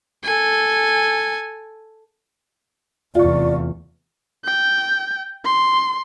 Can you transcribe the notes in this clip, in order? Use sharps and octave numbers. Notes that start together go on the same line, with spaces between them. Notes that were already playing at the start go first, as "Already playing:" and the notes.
A4 G#5
F1 E2 F4 D5 C#6
G5
C6